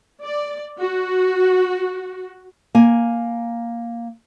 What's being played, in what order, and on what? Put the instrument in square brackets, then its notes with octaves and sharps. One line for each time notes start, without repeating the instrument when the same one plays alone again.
[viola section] D5
F#4
[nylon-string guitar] A#3 G#5